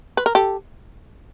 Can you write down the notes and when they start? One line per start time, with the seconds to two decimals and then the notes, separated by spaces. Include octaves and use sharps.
0.17 B4
0.26 A#4
0.35 G4 A4